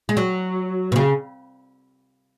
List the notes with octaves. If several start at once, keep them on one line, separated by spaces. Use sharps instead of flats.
G#3
F#3
B2
C#3